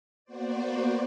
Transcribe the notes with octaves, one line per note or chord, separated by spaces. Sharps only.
A#3 B3 F#4 C5 D5